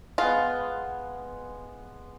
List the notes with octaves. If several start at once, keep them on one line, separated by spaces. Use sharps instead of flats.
G#3 B3 F4